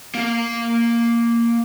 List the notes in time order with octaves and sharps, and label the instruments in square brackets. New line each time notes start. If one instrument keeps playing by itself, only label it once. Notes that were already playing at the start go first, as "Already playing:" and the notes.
[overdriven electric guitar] A#3 F5